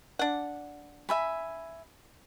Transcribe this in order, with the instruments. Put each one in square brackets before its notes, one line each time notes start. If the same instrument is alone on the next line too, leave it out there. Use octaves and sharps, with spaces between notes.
[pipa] D4 F#5
[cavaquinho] E5 G#5 B5